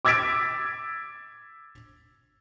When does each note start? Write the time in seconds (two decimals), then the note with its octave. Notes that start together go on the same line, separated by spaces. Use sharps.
0.05 D6 E6 G#6 A6 B6 D7